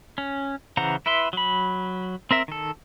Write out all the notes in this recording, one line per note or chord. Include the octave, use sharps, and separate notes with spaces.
C#4
C#3 E3 C5 F#5 A#5
E4 B4 E5 C6
F#3 B5
C4 A#4 E5
D#3 A4